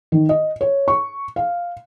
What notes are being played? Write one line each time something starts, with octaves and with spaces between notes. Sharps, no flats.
D#3
D#5
C#5
C#6
F5